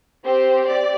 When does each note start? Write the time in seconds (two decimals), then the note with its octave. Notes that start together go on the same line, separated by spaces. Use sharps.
0.24 C4 G4 C5
0.67 D5